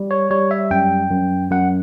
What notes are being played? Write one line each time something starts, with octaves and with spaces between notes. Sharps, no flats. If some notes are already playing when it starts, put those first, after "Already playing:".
Already playing: G3
C#5
G3 C#5
E5
F#2 G5
F#2
F#2 F#5